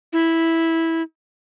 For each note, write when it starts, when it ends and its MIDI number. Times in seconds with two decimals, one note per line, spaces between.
0.13 1.02 64